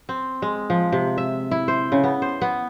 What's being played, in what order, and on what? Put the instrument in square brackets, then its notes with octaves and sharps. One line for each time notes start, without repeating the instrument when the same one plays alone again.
[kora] C4
G#3
F3
C3
E5
E4
C5
C#3
B3
C5
B3